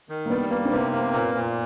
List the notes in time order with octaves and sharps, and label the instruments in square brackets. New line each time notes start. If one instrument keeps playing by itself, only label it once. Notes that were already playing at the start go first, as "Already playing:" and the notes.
[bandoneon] D#3
[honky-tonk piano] A#3
[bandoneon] G3 [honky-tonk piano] B3
[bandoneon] A#3 [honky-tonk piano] B3
[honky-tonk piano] C4
[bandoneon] C3 [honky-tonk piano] B3
[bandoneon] A#3
A#2
A#2